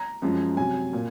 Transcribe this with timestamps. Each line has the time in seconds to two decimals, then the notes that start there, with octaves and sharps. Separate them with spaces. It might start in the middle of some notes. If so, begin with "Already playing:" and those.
Already playing: A#5
0.22 F#2 F3 G#3
0.57 C3 F#3 G#5
0.93 A#2